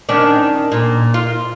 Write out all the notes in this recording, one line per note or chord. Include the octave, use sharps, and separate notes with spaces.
D#3 C#4 D4
A#2
F4